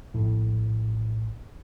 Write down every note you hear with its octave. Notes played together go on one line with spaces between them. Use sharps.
A#1 A2